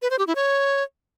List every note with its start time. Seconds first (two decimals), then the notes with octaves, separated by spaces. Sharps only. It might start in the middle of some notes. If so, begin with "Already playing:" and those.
0.02 B4
0.10 C5
0.19 G4
0.27 E4
0.35 C#5